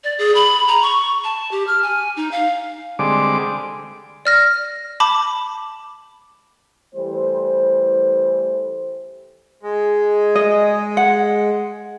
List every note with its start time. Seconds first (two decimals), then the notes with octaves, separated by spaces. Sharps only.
0.04 D5
0.19 G#4
0.35 B5
0.68 A#5
0.82 C#6
1.24 A5
1.51 G4
1.67 F6
1.83 G#5
2.16 D#4
2.31 F5
2.99 D3 G3 G#3 C4 D6
4.25 D5 F6 A#6
5.00 A5 B5 D6
6.95 E3 G3 A3 C5
9.63 G#3
10.35 D#5
10.97 F#5